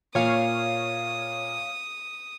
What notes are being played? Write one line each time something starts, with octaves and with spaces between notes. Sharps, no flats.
A#2 C#5 F5 D#6